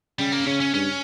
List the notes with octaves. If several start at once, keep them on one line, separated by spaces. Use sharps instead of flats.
C#3 G3
A#3
C#3 C#4
C#4
G2 C#4